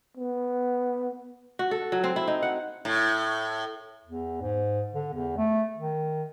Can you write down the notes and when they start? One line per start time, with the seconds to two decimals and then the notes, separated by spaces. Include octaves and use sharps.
0.17 B3
1.59 F#4
1.71 A4
1.92 F#3
2.04 C4
2.16 E4
2.27 D#4
2.42 F#5
2.85 A2
4.05 E2
4.42 G#2
4.92 D3
5.14 E2
5.37 A3
5.76 D#3